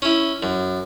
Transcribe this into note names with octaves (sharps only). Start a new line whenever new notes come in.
C#4 E4
F#2